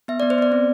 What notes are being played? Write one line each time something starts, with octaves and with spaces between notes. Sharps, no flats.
B3 E5
B3 D5
C5
B3 D5
C4